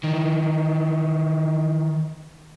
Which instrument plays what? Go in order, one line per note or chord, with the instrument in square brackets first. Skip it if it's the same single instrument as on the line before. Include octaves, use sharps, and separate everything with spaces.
[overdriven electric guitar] D#3 E3